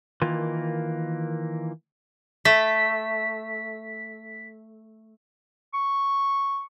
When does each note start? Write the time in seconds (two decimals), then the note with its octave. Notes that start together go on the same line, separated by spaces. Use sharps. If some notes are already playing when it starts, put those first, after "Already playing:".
0.22 D#3 E3 A#3 F4
2.45 A3 B6
5.74 C#6